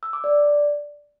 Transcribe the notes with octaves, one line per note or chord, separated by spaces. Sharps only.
E6
D6
D5